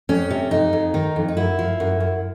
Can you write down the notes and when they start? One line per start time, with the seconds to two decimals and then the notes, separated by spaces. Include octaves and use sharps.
0.09 F2 C#4
0.31 C3
0.51 F2 D#4
0.73 F2
0.94 D#3
1.16 F2
1.28 D#4
1.37 F#2 E4
1.59 F3
1.80 F#2
2.00 F#2